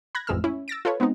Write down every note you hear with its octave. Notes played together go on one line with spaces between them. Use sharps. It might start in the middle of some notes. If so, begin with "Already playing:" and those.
B5 F#6 G#6 A#6
A1 F2 G#3 A3 E6 F6
C#4 E4
E6 A6 A#6 D7
F4 A4 B4 C#5
G#3 B3 C4 D#4